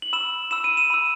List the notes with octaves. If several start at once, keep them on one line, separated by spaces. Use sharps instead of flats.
F#7
B5 E6 E7
B5 E6 E7
D#7
E7
B5 E6